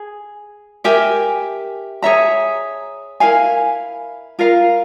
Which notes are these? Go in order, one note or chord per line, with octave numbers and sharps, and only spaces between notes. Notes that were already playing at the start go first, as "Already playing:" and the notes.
Already playing: G#4
G4 A#4 E5 G#5
G#4 C#5 E5 A#5
E4 A#4 F5 G#5
F4 A#4 F5 A#5